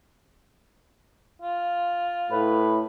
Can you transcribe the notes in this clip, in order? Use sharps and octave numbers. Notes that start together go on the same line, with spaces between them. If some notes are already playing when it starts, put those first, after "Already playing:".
F4
A2 B4